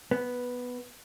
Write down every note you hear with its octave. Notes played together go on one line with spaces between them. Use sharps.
B3